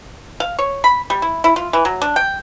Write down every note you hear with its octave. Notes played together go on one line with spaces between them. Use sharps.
F5
C#5
B5
G3
E4
E4
F4
E3
F#3
D4
G5